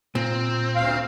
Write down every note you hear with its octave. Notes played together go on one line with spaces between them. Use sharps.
A#2 C4
D2 F5